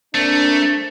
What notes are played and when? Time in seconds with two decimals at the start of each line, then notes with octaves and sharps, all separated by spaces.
0.15 A3 A#3 C4 D4